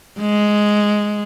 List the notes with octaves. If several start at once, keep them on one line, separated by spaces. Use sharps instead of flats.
G#3